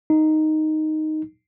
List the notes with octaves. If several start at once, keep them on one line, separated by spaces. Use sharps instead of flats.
D#4